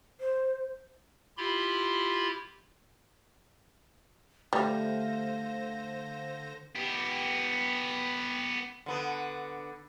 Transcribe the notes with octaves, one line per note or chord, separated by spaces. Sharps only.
C5
E4 F4 G4 B5 C6
D3 G3 A3 C5 F5 A#6
B3 G4
D3 B3